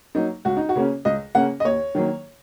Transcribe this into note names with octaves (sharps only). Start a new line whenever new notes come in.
F#3 A#3 D#4
C#2 F#4
D#4
F#4
C#3 A#3 C#4
C#2 D#5
C#3 A#3 C#4 F#5
D#5
D#2 C#5
D#3 F#3 A#3